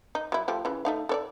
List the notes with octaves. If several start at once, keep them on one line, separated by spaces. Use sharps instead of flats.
D#4
F#3 E4
F3 A3 G4
C#3 E3
A3 D#4 F5
A4 C#5 D5